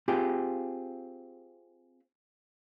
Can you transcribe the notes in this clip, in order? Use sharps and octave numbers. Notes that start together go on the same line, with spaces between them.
C4 F4 G4 G#4